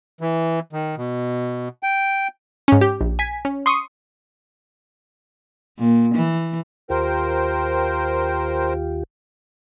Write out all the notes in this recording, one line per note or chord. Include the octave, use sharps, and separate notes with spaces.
E3
D#3
B2
G5
G#2 C#4
G4
A#1
G#5 B6
C#4
C6 C#6 D#6
A#2
E3
D#2 F4 G4 A#4 C5 G5